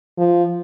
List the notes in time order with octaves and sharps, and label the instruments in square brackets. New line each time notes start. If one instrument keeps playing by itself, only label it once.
[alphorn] F3